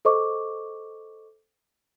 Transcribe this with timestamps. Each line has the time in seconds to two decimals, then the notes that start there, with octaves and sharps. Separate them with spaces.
0.05 A4 C5 D#5 C#6 D6